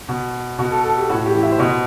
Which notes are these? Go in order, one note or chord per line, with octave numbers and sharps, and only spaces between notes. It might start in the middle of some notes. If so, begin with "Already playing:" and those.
B2
B2 F#4
A4
A4
G4
A2 F#4
G4
E3
E5
C5
B2 D#5